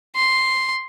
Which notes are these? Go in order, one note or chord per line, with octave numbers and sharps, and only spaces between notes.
C6